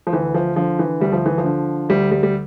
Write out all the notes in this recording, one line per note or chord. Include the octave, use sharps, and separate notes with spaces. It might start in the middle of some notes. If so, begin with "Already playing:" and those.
F3
D2 E3
F3
D3 F3
E3
D2 G3
F3
E3
F3
D3
D2 G3
G3
G3